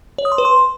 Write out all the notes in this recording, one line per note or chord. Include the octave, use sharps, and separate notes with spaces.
C#5
D#6
C6
B4
C6